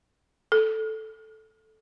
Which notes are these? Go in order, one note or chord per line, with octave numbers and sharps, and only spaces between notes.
A4